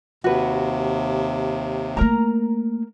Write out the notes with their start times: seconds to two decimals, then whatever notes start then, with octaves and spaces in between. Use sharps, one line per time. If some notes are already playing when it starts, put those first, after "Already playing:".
0.24 D#2 C3 F#4 B4
1.97 A3 A#3 A#4 A#5